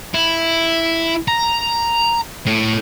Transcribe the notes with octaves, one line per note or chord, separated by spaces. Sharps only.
E4
A#5
A2